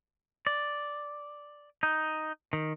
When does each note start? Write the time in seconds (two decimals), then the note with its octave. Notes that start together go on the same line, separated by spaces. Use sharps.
0.47 D5
1.83 D#4
2.53 D#3